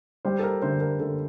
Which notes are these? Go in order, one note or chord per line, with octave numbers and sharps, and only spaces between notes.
G3 C5
A4
A#4
D3 C5
A#4
D3 A4